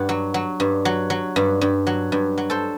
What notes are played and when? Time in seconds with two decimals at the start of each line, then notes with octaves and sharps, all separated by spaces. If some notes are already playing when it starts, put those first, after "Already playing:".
Already playing: G2 D5 F#5
0.09 F#3
0.34 F#3
0.60 G2
0.85 F#3
1.10 F#3
1.36 G2
1.61 G2
1.87 F#3
2.12 G2
2.38 F#3
2.50 A4 C5